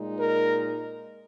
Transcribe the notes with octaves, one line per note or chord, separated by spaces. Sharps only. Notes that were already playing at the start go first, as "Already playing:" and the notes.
Already playing: A#2 G#3 D#4
A#4